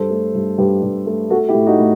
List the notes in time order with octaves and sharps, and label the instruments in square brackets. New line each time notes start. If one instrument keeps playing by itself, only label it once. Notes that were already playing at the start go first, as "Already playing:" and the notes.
Already playing: [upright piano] G2 A4 C5
A3
G2
G2 G4 B4
G2
A3
A3 F#4 A4
E4 G4
A2
D#4 F#4
A2